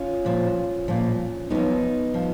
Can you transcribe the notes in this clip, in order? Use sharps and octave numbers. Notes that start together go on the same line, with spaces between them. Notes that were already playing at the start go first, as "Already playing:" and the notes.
Already playing: C#4 F4
A#2 F3
A#2 F3
F#2 F3 B3 D#4
F3